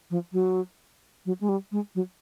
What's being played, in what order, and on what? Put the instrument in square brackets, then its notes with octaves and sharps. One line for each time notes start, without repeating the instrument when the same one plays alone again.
[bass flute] F3
F#3
F#3
G#3
G3
G#3
F#3